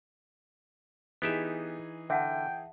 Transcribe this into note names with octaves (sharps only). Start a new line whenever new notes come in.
E3 B3 D#4 G4 G#4 E5
D3 E5 F#5 G5 A5